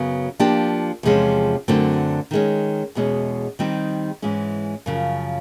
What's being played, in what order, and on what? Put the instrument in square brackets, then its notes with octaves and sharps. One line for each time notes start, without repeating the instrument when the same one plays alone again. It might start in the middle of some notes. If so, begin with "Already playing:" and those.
Already playing: [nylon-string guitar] F#2 C#3 F#3 B3
F3 A#3 D4 G4
E2 C3 F3 G#3 C#4
F#2 D3 F#3 A3 C4
D#3 G#3 C#4
E2 B2 G#3 C#4
D#3 G3 C4 D#4 G4
G#2 E3 G#3 C#4
F#2 C#3 F3